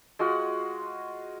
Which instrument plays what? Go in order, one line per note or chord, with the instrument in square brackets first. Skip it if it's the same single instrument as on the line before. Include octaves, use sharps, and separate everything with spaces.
[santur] G#3 F4 F#4 F#5